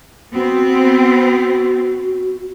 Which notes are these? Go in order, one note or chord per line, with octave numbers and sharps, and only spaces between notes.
B3 C4 F#4